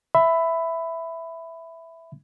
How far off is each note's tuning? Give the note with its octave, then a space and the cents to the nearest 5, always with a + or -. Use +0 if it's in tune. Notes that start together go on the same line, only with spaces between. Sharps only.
E5 +0 B5 +15